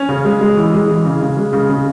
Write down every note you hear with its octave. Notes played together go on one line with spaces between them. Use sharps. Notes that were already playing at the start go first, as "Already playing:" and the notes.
Already playing: C#4
C#3
G#3
G#3
E3
G#3
E3
C#3
C#3
G#3
C#3
C#3